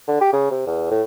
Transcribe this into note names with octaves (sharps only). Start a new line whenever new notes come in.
D3
G4
C#3
C3
E2
A2